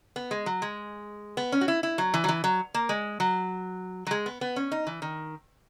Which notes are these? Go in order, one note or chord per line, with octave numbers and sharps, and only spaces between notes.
B3
G#3
F#3
G#3
B3
C#4
F#4
E4
E4
F#3
E3
F#3
E3
F#3
A#3
G#3
F#3
F#3
G#3
B3
B3
C#4
D#4
E3
D#3